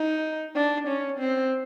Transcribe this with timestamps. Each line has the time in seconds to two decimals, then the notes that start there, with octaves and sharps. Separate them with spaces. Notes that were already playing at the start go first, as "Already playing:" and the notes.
Already playing: D#4
0.55 D4
0.87 C#4
1.19 C4